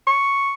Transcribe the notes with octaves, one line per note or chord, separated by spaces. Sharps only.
C#6